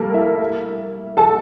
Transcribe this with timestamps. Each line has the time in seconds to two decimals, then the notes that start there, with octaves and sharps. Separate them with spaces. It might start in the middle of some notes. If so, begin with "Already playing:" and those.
Already playing: G3 A3 A#3 G4 A4 A#4
0.14 E4 E5
1.17 A4 A5